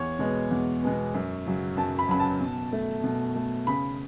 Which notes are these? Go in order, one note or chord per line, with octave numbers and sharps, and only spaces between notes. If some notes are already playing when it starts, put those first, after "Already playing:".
Already playing: E2 C#5
B2 G#3 B3
E2
B2 G#3 B3
F#2
C#3 F#3
F#2 A5
B5
C#3 F#3 B5
A5
B2
A3
B2
A3
C#3 B5